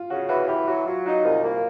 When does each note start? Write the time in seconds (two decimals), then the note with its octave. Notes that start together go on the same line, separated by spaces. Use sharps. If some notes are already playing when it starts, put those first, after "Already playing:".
Already playing: F4
0.10 C#3 F#4
0.29 E3 F#4
0.48 E3 G4
0.67 F#3 F#4
0.86 F#3 F4
1.06 D#4 F#4
1.24 C2 F4
1.44 A#3